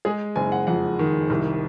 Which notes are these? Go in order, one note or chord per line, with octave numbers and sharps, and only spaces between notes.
G#3 G#4
F#1 G#5
F#5
F2 F#5
D#3
C2